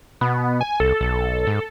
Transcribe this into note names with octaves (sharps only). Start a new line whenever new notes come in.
B2 B3
G#5
C2 A4
B1
G#2